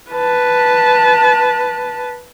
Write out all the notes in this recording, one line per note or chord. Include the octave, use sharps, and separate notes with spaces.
B4 A5